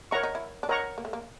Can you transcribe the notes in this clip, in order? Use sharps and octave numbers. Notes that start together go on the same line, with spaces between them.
E4 A#4 C#5 F#5 A#5 C#6
D#4
E4
D4
D#4 A#4 C#5 F#5 A#5 C#6
A#3
A3
A#3